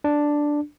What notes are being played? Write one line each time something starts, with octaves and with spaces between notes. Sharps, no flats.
D4